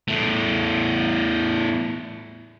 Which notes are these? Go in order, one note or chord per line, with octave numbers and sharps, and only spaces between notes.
E2 A2